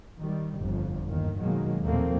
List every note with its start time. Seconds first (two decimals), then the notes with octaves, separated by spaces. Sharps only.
0.18 D#3 G3
0.59 G1 F2
1.08 G1 D#2 D#3
1.38 B2 D#3 F#3 G#3 A#3
1.84 D#2 A#2 F3 A3 A#3 C4